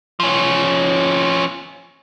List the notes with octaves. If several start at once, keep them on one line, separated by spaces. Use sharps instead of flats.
F3 C#4